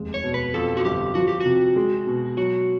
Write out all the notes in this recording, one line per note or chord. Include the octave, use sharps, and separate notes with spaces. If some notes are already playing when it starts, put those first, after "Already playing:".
Already playing: F1 D#2 G#3
C#5
B2
B4
F2 A4
F#4
G1 G4
F3 F#4
G4
C3 F#4
G#3
B2
F#3 F#4